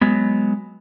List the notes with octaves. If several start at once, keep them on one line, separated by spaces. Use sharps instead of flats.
F#3 G#3 B3